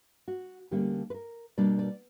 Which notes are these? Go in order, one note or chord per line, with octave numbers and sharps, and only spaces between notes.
F#4
D2 D3 G3 A#3 C#4 G4
B4
A#4
B2 G3 A#3 D4 D5
D5